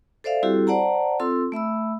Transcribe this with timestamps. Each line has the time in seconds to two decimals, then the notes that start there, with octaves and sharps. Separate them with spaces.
0.24 A4 C5 D5 E5 F5
0.43 G3 C4 E4 F#4 G4 A4
0.67 C5 D5 F#5 A5 A#5
1.20 C4 F4 A4 C6 E6
1.52 A3 E5 B5 E6